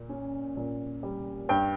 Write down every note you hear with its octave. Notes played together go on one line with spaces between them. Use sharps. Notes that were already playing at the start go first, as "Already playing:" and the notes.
Already playing: A#2
C#4
A#2
G3
G2 G5